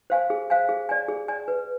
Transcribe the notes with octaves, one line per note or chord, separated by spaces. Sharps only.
C5 F5 G#5
G#4
C5 F5 G#5
G#4
D5 G#5
G#4
D5 G#5
B4